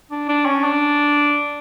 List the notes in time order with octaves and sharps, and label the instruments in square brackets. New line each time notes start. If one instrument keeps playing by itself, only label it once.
[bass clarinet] D4
D4
C#4
D4